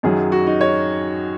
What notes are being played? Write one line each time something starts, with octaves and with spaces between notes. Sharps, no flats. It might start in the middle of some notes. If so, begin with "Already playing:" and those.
F#2 D#3 F#3 G#4
F#4
D#4
C#5